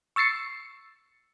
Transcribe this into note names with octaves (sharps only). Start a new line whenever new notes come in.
C#6 E6 A6 C7 C#7